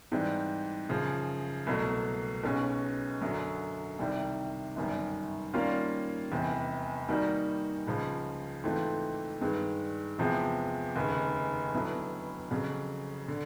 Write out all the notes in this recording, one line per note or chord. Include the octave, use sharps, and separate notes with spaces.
G#2 E3 G3 C4
F#2 C#3 F3
C2 B2 F#3 A3
B1 B2 G#3 C#4
F#2 D3 F#3
C2 C3 D#3 G3
G1 F#2 D#3 G3
D#3 G3 A#3 C#4 F4
F1 E2 C3
D#3 G3 A#3 D#4 F#4
C#2 C#3 F3
G#2 E3 A3 C4 F4
G2 D#3 G#3
E2 C3 F3 G#3 B3
F1 D#2 C#3
D3 F#3 B3 E4 A4
F2 C#3 F#3
D3